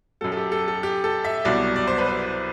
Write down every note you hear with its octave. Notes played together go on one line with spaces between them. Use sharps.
F#2 F#3 A4
A4
G4
A4
A4
G4
A4
E5
C2 B2 F#3 D5
D5
C5
B4
C5